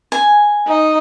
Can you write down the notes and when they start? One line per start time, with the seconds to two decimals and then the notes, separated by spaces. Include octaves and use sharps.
0.12 G#5
0.67 D#4